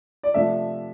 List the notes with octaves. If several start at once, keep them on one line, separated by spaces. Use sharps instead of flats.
D5
C3 F3 A3 D4 E5